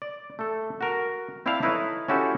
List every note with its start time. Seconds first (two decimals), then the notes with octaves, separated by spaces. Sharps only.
0.02 D5
0.39 A3 A4
0.81 F#4 A#4
1.46 C4 E4 D5 E5 F5 A5
1.63 D#4 E4 A4 B4 C#5
2.08 C#4 E4 F#4 G4 A4 C5